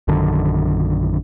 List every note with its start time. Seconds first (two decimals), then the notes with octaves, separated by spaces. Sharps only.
0.08 A#1 F#2 D3 D#3